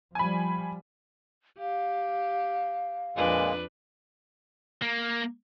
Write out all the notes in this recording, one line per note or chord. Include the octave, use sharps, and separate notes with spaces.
F3 G3 G#5 B5
G4 F5
F2 A#2 G#3 A#3 D4 B4
A#3